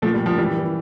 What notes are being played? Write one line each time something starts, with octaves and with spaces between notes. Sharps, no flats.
A#2 F3 A3
G3
A#2
F3
E3 G3
E3